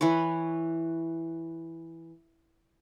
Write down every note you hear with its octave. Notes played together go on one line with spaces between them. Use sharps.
E3 B4 C#5